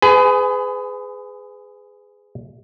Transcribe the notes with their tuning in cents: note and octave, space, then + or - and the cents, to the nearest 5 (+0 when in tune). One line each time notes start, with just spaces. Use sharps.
G#4 +0 B4 +35 G#5 +25